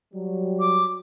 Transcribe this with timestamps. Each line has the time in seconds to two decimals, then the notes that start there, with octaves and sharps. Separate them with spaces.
0.14 F#3 G3
0.60 D6